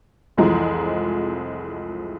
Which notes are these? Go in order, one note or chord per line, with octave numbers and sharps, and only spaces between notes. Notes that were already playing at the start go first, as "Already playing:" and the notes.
F1 C2 E3 F3 G#3 A#5